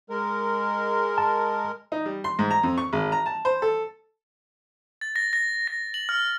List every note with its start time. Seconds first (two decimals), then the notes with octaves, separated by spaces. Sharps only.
0.10 G#3 A#4
1.18 A5
1.92 D#4
2.06 G3
2.24 C6
2.39 G#2
2.51 A#5
2.63 F2
2.78 C#6
2.93 G#1
3.12 A#5
3.26 A5
3.45 C5
3.62 A4
5.01 A6
5.16 A#6
5.33 A#6
5.67 A#6
5.94 F#7
6.09 F6